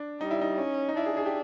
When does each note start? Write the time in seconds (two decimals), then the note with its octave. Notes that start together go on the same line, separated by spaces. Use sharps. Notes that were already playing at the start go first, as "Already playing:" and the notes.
Already playing: D4
0.20 G3 D#4
0.31 E4
0.41 D#4
0.58 C#4
0.89 D#4
0.97 D4 E4
1.06 G#4
1.17 G#4
1.26 G4